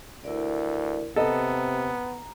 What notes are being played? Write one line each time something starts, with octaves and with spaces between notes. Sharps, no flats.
D2 E4 A#4 D5
C3 B3 A4 D#5 A#5